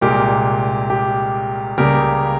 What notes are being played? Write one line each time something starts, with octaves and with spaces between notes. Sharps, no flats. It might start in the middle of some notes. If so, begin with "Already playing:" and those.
C2 A#2 G#3 G4 A#4
G4
C#2 C#3 G3 A#3 G4 A#4